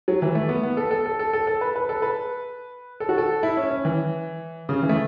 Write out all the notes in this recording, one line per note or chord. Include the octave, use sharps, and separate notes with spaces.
F#3
E3
A3
B3
B3
A4
A4
A4
A4
A4
A4
B4
B4
A4
B4
A4
F#4
A4
E4
C#4
C#4
E3
C#3
E3
A3